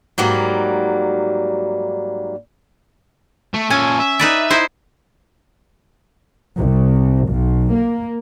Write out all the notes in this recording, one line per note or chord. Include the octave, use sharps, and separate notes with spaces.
G#2 F#3 G3 A#3
A3
A#2 C#4 A4 G#5
E5
D#4 B4 D5
D#4 E4 C5
C2
B1
A#3